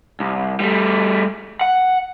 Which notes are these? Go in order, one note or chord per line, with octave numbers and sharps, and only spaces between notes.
C2
G3 A3
F#5